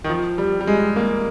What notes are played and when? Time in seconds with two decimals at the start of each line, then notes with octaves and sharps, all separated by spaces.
0.04 D#3
0.09 F3
0.38 G3
0.61 G3
0.67 G#3
0.96 A#3